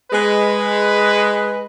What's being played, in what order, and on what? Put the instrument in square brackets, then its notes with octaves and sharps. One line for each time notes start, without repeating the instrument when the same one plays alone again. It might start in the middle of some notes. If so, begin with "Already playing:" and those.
[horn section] G#3 B4